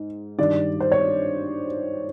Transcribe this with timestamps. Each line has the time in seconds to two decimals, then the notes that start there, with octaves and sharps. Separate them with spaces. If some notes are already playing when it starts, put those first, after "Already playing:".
Already playing: G#2
0.38 G2 D#3 G3 D5
0.80 C5
0.92 C#5